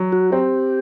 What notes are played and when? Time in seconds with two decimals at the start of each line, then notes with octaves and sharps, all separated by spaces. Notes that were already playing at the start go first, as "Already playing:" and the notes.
Already playing: F#3
0.12 F#4
0.32 C4 G4